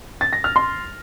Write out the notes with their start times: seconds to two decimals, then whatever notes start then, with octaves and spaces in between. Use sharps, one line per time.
0.21 A6
0.33 A#6
0.44 F6
0.56 C6